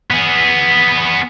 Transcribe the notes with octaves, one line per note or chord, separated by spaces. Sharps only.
B3 G#4